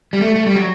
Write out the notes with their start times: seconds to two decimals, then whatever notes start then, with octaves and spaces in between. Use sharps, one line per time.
0.13 G3
0.21 A3
0.36 A3
0.46 G3
0.56 F#3